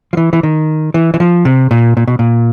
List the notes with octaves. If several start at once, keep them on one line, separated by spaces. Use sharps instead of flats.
F3
E3
E3
D#3
E3
E3
F3
C3
A#2
A#2
B2
A#2